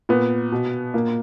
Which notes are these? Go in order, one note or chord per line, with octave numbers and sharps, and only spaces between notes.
A#2 B3
B2
A#2 A#3